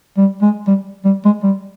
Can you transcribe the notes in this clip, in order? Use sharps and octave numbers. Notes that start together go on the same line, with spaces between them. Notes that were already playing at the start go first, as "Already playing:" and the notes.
G3
G#3
G3
G3
G#3
G3